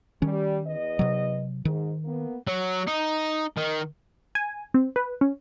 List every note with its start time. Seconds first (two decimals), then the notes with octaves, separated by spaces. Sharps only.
0.22 D#3 G3 C#4
0.67 E2 B4 D#5
0.99 C3 F#3
1.65 G#2 D#3
2.05 A#3 B3
2.47 F#3
2.87 D#4
3.57 D#3
4.35 G#5
4.74 C4
4.96 B4
5.21 C#4